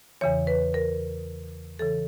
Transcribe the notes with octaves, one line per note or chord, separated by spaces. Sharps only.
E2 C#3 E3 C#5
B4
A#4
C#3 E3 A4